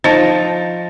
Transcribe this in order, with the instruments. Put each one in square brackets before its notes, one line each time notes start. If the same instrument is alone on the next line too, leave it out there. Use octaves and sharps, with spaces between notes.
[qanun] F3 [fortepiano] D#4 [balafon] F4 C5 [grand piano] A5 A6